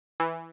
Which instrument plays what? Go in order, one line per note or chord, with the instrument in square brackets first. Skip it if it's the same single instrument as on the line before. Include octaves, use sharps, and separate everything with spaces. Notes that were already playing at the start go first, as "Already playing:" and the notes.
[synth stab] E3